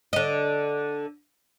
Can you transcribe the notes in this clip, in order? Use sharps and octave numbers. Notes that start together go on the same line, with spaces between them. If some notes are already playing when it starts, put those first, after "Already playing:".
D3 D#5